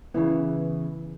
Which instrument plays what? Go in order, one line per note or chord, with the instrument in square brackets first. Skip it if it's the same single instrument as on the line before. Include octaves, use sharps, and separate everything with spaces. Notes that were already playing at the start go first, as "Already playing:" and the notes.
[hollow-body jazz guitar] C#3 E3 B3 E4